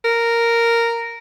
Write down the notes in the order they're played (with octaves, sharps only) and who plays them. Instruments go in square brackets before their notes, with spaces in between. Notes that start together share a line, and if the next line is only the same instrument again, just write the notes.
[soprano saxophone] A#4